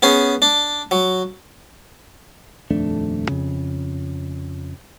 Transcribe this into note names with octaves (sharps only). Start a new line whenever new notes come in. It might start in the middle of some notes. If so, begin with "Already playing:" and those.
B3 C#4 G#4
D4
F#3
D#1 F2 A3 D4
F2 C#3